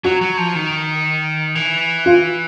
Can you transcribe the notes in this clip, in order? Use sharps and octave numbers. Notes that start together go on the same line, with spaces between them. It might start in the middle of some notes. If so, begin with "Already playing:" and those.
F#3 F#4
F#3
F3
D#3
E3
F4